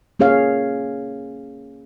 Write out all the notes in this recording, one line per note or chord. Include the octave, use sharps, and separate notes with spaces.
A#3 C#4 G#4 C#5 F5